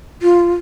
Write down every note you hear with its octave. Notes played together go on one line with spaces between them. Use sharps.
F4